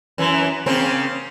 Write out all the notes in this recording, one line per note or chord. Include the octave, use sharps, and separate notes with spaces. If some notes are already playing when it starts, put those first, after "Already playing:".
F#2 E3
C#3 A#3 C4